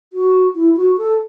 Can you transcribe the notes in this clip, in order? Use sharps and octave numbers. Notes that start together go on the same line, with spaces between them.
F#4
E4
F#4
A4